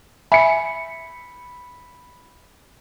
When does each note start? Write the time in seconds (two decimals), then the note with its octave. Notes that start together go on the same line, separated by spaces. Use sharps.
0.32 E5 G#5 B5 C#7